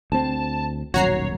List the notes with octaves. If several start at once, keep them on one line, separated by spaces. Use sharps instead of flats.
D2 C4 A5
D#1 B1 F#2 F#4 C#5 A#5 C7